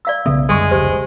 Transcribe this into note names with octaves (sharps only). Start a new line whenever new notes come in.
D5 F5 E6
B1 C#3 B3 A4 E5
F#2 D3 G3 G#3 A4 C#6
F1 C#2 G4 C5